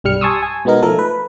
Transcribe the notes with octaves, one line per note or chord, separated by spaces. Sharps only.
B1 G2 G3 F6 C#7
G#5 A5 C6 C#6 D#6 E6
G#5
B2 G#3 B3 D#4 A#4
F3 A3 A4 A#4
B4